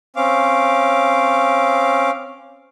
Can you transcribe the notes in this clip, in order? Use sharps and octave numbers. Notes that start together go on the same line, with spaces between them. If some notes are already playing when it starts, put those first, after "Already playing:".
C4 C#4 F5 D6